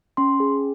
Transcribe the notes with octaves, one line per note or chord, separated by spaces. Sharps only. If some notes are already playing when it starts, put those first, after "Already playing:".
C#4 C6
G#4